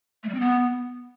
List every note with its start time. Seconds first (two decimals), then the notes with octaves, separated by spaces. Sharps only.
0.23 A3
0.29 G3
0.34 C4
0.40 B3